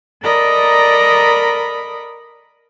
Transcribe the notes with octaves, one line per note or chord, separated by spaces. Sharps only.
A4 A#4 D5 D#5 A#5 B5